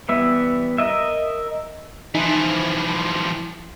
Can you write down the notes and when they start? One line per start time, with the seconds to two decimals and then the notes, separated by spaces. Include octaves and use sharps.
0.09 E3 G3 B3 E5
0.78 A#4 D#5 E5
2.15 E3 F3 D#4